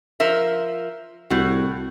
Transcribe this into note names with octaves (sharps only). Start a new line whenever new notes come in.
F3 A#4 E5
C2 A2 F#4